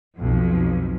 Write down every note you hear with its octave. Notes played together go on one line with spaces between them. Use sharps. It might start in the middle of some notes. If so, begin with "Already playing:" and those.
B1 F2